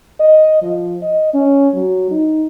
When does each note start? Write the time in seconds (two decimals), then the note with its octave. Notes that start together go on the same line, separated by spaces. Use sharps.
0.20 D#5
0.62 F3
1.02 D#5
1.33 C#4
1.74 F#3
2.11 D#4